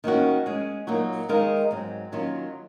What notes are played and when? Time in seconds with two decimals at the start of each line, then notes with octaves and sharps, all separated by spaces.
0.04 D#3 A#3 C#4 F#4
0.46 G#3 C#4 G#4
0.87 A#2 F#3 A#3 D#4 F#4
1.29 D#3 G#3 D#4 A#4 F5
1.71 G#2 F#3 C4
2.12 D#3 F#3 A#3 C#4 F4